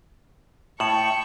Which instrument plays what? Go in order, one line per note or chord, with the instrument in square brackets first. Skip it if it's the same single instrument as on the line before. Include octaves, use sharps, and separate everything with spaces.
[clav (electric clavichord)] A2 [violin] G5 C#6 [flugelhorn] A5 [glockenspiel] C#7 E7 F#7